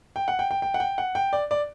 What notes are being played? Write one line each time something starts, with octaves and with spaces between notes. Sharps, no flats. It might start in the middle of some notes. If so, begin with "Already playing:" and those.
G5
F#5
G5
G5
G5
F#5
G5
F#5
G5
D5
D5